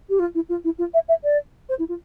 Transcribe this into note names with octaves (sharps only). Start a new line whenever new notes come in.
G4
F4
E4
F4
E4
F4
E5
E5
D5
C5
E4
F4